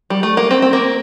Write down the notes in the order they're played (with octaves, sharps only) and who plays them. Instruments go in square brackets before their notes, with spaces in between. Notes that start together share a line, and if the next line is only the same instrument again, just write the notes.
[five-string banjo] G3
A3
A#3
C4
C4
A#3